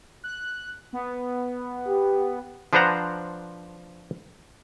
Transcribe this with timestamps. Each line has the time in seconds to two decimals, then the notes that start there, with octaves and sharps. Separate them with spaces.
0.24 F#6
0.93 B3
1.88 G4
2.73 F3 D4 B4 C5 F#5 A#5